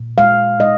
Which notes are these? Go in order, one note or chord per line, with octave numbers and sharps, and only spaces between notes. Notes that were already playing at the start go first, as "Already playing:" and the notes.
Already playing: A#2
G#3 F5
G#3 D#5